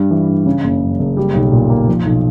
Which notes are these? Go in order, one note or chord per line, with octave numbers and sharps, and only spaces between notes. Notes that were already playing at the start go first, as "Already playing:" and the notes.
Already playing: G2 G3
E3
G2
C#3
F#1
F#2
F#1
G3
B1
A#2
A#3
F3
B1